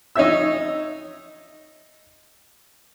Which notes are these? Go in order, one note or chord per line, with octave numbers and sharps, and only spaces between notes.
D#4 C#5 E5 E6